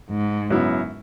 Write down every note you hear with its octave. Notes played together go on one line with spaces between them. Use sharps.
G#2
F#2 C#3 F#3 B3 E4